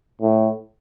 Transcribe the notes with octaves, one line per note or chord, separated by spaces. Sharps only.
A2